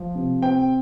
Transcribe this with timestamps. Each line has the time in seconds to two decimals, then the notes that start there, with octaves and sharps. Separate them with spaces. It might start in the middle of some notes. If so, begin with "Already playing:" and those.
Already playing: F3
0.15 C3
0.42 C4 G5